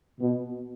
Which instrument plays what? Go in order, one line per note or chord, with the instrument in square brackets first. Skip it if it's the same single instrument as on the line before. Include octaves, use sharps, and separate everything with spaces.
[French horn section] B2